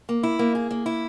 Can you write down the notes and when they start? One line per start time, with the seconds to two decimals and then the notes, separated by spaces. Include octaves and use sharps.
0.09 A#3
0.23 E4
0.39 A#3
0.55 G#4
0.71 A#3
0.86 E4